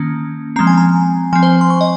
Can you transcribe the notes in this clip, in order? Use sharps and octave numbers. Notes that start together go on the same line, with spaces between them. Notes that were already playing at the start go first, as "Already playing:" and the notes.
Already playing: D#3 A#3 C#4
F3 G#3 C4 A#5
G#5
A#5
F3 C4 G#5
C5
C6
C#6
D#5